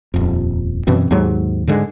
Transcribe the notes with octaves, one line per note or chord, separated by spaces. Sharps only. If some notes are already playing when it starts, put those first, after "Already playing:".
D#1 F2
F#2 B2 E3 C4
D#2 G#2 F#3
G#2 D3 G#3